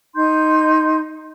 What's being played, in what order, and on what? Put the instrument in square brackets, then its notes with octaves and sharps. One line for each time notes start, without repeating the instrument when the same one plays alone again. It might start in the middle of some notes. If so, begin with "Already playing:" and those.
[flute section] D#4 C6 G6